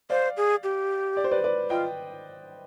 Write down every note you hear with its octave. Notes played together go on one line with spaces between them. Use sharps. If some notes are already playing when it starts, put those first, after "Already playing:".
C5 D5 F5
G#4
G4
D5
C5
B4 D5
B4 D5
F4 D#5 G5